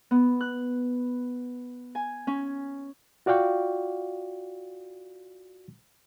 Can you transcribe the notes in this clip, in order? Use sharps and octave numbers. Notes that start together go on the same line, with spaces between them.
B3
F#6
G#5
C#4
F4 F#4 D5 F5 G5 C#6